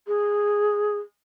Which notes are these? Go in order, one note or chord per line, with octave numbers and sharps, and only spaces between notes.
G#4